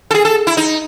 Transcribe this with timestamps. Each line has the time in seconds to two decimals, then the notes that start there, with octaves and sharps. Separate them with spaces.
0.11 A4
0.14 G#4
0.25 A4
0.47 E4
0.57 D#4